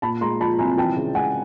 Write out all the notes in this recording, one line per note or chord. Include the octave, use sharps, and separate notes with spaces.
A#2 A5 B5
G#3 A#5 C6
F3 A5 B5
C2 G#5 A#5
E3 G5 A5
C#3
G#3 F#5 G#5